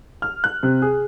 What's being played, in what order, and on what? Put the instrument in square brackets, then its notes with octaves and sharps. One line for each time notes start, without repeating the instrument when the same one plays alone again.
[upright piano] F6
F#6
C3
G#4